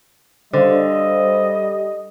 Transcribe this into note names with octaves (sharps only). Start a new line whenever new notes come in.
D3 G3 C5 D#5 F5